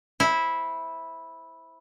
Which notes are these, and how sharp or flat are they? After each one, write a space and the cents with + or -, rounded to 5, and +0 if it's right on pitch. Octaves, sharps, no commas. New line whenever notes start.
E4 -10 C5 +0